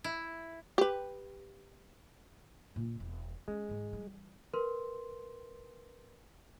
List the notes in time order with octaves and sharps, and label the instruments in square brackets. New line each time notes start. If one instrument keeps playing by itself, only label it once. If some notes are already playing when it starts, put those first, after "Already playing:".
[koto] E4
[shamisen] G4 B4
[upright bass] A#2 D4
E1
[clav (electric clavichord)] G#3 [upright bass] C#4
[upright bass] G#2 D#3
E3 G3
[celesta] A#4 B4 C6